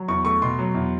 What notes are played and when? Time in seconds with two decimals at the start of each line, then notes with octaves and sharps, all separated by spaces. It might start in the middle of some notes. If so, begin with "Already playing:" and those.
Already playing: F#3
0.08 E2 C#6
0.25 A3 C#6
0.42 B2 C6
0.59 F#3
0.75 E2